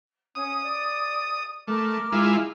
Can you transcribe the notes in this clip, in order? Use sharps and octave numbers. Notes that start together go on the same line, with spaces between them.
C#4 F5 D#6
D5
A3 A#4 D6 F6
G#3 E4 F4